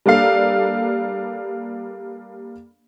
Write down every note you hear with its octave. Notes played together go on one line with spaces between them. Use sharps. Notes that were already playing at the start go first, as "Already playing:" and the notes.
G3 A#3 D4 A4 F5